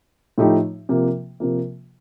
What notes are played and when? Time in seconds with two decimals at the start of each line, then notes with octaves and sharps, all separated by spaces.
0.38 A2 F3 A3 D#4 G4
0.89 C3 F3 A#3
1.40 C3 F3 A#3